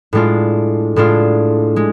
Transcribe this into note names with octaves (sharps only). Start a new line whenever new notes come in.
A2 G#3 D4 F4
A2 G#3 D4 F4
G#3